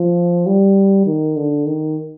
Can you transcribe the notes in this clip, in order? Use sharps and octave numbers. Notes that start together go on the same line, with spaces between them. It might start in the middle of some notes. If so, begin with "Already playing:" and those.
Already playing: F3
G3
D#3
D3
D#3